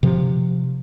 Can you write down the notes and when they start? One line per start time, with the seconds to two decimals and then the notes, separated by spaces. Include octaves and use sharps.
0.03 C3 F3